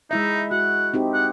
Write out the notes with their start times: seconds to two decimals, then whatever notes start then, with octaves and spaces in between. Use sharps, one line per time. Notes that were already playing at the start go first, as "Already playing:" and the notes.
0.11 G#3 D#4 E4 E5
0.51 F#4 F#5
0.94 C4 D#4 G4
1.14 F#5